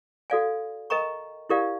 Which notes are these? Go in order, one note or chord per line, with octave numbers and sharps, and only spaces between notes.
F#4 A4 D5 F5 G#5
A#4 D#5 G5 A#5 C#6
E4 G4 A#4 D5 F5